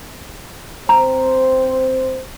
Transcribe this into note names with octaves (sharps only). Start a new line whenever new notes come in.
C4 C5 A#5